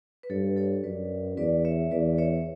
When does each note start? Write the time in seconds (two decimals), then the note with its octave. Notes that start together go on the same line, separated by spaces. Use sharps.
0.23 B4
0.30 G2 A4 C#5
0.56 A4 C#5
0.84 F#2 B4 D5
1.37 E2 B4 D5
1.65 C#5 E5
1.91 E2 B4 D5
2.18 C#5 E5